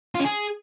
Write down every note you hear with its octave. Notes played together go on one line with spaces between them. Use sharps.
F4
C#4
G#4